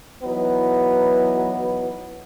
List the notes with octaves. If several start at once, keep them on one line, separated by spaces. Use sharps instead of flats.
E3 F#3 B3 D#4 B4